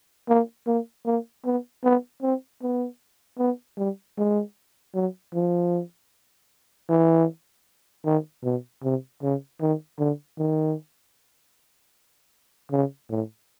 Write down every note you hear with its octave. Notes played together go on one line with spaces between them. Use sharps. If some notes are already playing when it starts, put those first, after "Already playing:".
A#3
A#3
A#3
B3
B3
C4
B3
B3
G3
G#3
F#3
F3
E3
D#3
B2
C3
C#3
D#3
D3
D#3
C#3
A2